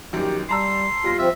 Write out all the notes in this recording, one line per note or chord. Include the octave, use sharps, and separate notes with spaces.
A#1 F#2 D#3 G4
G3 A5 A#5 C6 E6
E2 G3 F4 A#6
F3 C4 E5